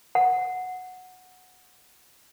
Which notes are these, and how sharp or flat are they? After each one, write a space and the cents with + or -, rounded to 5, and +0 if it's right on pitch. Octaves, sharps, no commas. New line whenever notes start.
F#5 -5